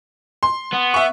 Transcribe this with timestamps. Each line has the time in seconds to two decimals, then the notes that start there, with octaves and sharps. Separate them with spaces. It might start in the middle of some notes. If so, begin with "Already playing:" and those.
0.43 C6
0.73 B3
0.94 E5 C#6